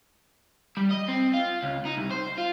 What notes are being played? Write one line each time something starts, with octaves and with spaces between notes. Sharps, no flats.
G3
D#5
C4
F4
C#2
D#4
C2
C5
F4